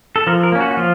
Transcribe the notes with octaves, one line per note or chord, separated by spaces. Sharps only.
A4
F3 A#4
A#4
A#3 C#4
F#4
F#4
F3 F4